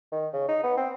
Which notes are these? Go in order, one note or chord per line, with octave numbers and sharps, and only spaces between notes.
D#3
C#3
D#4
B3
C4